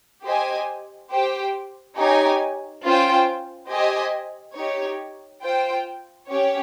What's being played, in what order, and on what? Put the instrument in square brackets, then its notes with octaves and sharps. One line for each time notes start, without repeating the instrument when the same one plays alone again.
[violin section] G4 C5 D#5 G#5
G4 C5 G5
D#4 G4 C#5 G#5
C#4 F4 C5 G5
G4 C5 D#5 G#5
D#4 G4 C#5
F4 C5 G5
C#4 G4 C#5